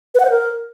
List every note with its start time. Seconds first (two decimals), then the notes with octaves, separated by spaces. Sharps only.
0.15 B4
0.20 F#5
0.25 C5
0.30 A#4